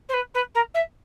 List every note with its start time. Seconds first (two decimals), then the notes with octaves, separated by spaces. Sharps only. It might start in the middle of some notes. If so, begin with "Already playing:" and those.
0.08 C5
0.13 B4
0.34 B4
0.54 A#4
0.74 E5